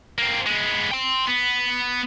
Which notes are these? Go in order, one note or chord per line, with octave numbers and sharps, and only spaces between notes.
A#3 C4
G#3 B3
G5 C6
B3